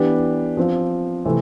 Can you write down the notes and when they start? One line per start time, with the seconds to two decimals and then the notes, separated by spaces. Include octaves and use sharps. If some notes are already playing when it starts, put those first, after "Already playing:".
Already playing: E3 B3 D4 G4
0.57 F3 C4 F4
1.25 C3 E3 A3 C4